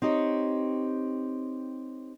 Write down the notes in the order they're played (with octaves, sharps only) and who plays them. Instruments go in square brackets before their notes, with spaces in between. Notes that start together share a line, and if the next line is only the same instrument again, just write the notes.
[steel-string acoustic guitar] C4 D#4 G4 C#5